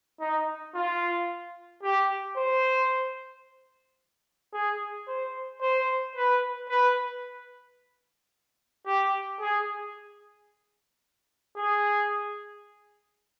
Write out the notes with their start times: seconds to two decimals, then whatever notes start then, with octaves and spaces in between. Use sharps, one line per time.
0.20 D#4
0.75 F4
1.83 G4
2.37 C5
4.53 G#4
5.07 C5
5.62 C5
6.16 B4
6.69 B4
8.86 G4
9.40 G#4
11.56 G#4